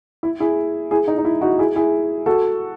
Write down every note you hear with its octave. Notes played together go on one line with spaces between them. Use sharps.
E4
E4 G#4
E4 G#4
D#4
D#4
E4
D#4 F#4
E4 G#4
E4 G#4
F#4 A4